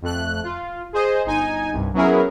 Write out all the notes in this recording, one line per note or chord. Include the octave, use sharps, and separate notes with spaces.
F2 A3 F#6
F4
G#4 C5 D#5
G1 D#4 G#5
C2 G2
F#3 B3 C#4 E4 G#4 A#4